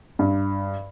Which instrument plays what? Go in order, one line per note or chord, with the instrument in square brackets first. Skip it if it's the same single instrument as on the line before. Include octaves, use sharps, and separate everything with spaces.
[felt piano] G2